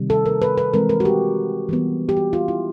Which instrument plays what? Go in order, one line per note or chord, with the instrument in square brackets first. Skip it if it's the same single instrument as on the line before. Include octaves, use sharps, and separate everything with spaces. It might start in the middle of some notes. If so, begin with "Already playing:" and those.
Already playing: [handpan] C3 D#3 G3
A4
A#4
B4
B4
E3 G#3 C4 A#4
A#4
F#4
G4
E3 G3 B3
G4
F#4
F4
E4